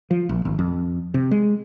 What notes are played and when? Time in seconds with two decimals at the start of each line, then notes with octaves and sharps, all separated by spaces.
0.11 F3
0.29 A#1
0.45 G#1
0.59 F2
1.14 C3
1.31 G#3